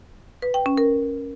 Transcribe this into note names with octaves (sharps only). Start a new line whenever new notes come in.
B4
G5
C#4
A#4